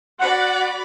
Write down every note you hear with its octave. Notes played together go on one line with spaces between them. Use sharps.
F#4 D5 F#5 B5